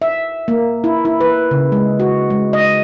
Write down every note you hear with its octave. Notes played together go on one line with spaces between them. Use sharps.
E5
A#3
E4
E4
B4
C#3
G#3
F#4
G#3
D#5